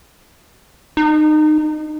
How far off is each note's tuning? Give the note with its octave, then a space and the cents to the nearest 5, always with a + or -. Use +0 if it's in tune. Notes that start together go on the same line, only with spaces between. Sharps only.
D#4 -25